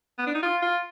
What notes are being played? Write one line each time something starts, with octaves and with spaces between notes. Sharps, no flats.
B3
D4
D#4
F4
F4